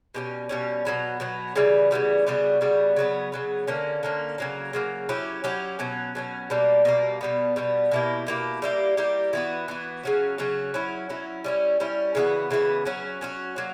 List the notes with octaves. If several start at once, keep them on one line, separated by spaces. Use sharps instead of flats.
B2 G3 C#4
B2 G3 C#4
B2 F#3 B3
B2 F#3 B3
C#3 E3 G3 B3
C#3 E3 G3 B3
C#3 G3 B3 F#4
C#3 G3 B3 F#4
C#3 F#3 B3
C#3 F#3 B3
D3 A#3 C#4
D3 A#3 C#4
C#3 F#3 A#3
C#3 F#3 A#3
F#3 C#4 E4 G4
F#3 C#4 E4 G4
B2 F#3 C#4
B2 F#3 C#4
B2 G3 A#3
B2 G3 A#3
B2 G3 B3
B2 G3 B3
B2 A#3 E4 G4
B2 A#3 E4 G4
G3 A#3 E4 G4
G3 A#3 E4 G4
E3 B3 F#4
E3 B3 F#4
C#3 F#3 C#4 F#4
C#3 F#3 C#4 F#4
F#3 C#4 E4
F#3 C#4 E4
G3 C#4 E4
G3 C#4 E4
C#3 E3 B3 F#4
C#3 E3 B3 F#4
F#3 C#4 F#4
F#3 C#4 F#4
F#3 A#3